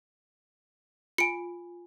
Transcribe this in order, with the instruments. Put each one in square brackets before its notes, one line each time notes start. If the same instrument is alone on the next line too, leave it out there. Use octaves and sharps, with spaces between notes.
[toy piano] F4 G#5 [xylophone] C#7 D7